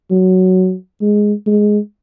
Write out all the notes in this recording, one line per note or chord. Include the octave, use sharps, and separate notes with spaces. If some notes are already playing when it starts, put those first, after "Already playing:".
F#3
G#3
G#3